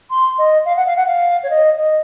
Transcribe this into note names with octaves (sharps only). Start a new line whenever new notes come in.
C6
D#5
F5
F#5
F5
F#5
F5
C#5
D#5
D#5